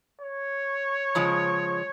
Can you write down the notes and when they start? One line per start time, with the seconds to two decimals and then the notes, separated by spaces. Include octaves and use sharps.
0.21 C#5
1.15 C#3 F3 G#3